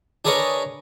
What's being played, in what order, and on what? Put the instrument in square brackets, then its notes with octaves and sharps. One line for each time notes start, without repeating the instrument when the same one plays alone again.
[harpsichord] D4 G#4 A#4 B4 C#5 D#5